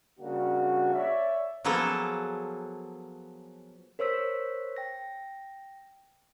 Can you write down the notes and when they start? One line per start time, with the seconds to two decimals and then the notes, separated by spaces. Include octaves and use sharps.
0.19 C#3 G3 A#3 D4 F#4
0.94 C#5 D5 E5
1.64 F3 F#3 A#3 B3 G#4 A4
3.99 A#4 C5 C#5 E6 B6
4.77 G5 A#6